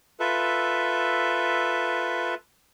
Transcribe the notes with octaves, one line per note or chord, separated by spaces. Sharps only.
F4 A4 B4 E5